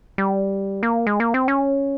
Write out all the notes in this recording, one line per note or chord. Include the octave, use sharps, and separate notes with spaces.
G3
A#3
G#3
A#3
C4
C#4